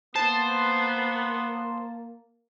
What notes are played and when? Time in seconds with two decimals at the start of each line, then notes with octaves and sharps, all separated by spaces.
0.16 A#3 B3 C5 A5